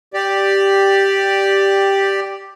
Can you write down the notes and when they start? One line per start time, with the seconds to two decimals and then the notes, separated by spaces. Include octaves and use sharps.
0.14 G4 D5